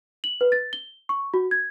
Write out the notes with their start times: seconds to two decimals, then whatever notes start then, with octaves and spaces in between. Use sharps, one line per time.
0.24 F#7
0.41 B4
0.52 A6
0.73 G7
1.09 C#6
1.34 F#4
1.51 G#6